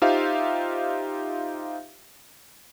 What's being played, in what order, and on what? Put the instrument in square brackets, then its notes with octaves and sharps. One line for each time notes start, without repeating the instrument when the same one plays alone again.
[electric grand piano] D#4 F4 G4 C5 E5 F5